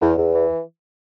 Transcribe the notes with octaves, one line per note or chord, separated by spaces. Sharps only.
E2
E2
E3